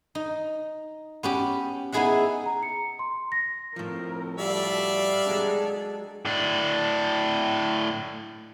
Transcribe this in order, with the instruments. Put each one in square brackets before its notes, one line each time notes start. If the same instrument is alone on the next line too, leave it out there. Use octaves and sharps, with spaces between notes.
[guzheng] D#4
B3 C#4 G4
B3 D#4 E4 G#4 E5 F#5
[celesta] A#5
C#7
C6
A#6
[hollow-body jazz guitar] A2 F3 [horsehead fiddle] C4 A#4
[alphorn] G3 [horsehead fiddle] F#4 A4 [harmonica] D5 E5 F5
[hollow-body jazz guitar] F#3 G#3 D4 [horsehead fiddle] G#4 A4
[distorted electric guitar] A2 D4